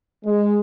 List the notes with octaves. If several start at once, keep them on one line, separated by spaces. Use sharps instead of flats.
G#3